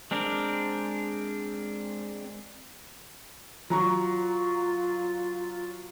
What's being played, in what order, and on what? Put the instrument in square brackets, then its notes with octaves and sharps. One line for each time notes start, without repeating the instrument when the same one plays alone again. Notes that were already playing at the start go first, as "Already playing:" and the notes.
[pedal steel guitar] G#3 C4 D4 A#4
[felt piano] F#3 A#5 C#6 [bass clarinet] F4